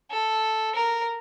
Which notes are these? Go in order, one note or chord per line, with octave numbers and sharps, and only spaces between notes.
A4
A#4